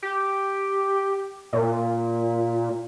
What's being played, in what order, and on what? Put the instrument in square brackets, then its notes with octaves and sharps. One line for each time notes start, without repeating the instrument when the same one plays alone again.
[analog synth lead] G4
A#2